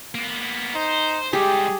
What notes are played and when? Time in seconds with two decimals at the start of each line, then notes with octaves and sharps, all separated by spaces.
0.15 A#3 B3
0.75 D#4 C5
1.33 G#2 G3 G4 G#4